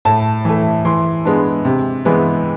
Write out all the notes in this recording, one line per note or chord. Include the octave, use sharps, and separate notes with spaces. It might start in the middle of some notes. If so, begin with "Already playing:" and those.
A2 A5
E3 A3
E3 C6
G#3 B3 D4
C3
E3 G#3 B3